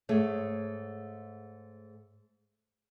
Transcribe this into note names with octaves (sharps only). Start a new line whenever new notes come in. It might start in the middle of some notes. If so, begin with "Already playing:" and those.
G#2 A3 G#4 C#5